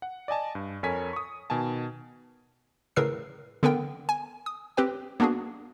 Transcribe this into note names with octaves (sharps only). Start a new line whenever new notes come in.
F#5
D5 D#5 G#5 A5
G2
F2 A4 A#4 C#5 G#5 B6
C#6 D#6
B2 D#3 G#5 A5
A2 C#3 A#4 B4 E6 C7
D3 B3 A#4 G5
G#5
D#6
C4 G4 B4 G5
A#3 B3 D4 F#4 G#4